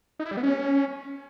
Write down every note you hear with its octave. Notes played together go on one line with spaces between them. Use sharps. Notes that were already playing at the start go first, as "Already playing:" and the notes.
D#4
E4
G3
B3
C#4